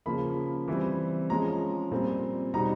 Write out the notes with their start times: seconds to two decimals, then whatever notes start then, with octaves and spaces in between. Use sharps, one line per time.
0.06 C#3 F3 A#3 B5
0.68 E3 G3 C4
1.29 F3 G#3 C#4 A#5
1.91 A#2 G3 C4
2.54 B2 G3 C4 D#4 A#5